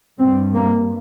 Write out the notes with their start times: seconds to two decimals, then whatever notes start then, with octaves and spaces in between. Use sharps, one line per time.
0.19 G2 C4
0.55 A#3